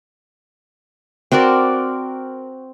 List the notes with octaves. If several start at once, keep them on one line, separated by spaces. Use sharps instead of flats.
C4 F#4 A#4 D5